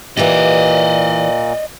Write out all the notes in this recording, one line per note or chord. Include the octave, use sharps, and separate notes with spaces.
A#2 E3 G4 D5 D#5